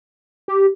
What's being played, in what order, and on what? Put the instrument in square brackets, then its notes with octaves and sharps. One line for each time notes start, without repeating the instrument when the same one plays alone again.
[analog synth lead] G4